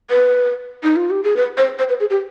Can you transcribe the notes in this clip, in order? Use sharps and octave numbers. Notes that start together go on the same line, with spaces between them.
B4
D#4
F4
G4
G#4
B4
C5
C5
B4
G#4
G4